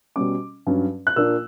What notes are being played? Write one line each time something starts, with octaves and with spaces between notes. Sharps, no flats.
B2 G3 C#4 D6
G2 F#3 C#4
F#6
A#2 A#3 D4 E6